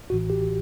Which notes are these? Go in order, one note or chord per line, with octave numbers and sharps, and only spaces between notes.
A1 A2 E3 F#4
G4